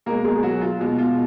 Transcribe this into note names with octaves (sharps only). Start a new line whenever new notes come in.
B2 G#3 A#3 A#4
G#3 G#4
G#4
F#3 F#4
F4
B2 G#3
F4